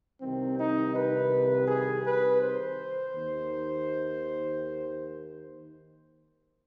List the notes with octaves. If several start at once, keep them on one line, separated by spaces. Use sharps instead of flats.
C2 C3 D#3 C4
D#4
B4
G#4
B4
C5
D#2 D#3